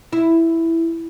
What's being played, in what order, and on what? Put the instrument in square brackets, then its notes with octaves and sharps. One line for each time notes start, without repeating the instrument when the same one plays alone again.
[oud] E4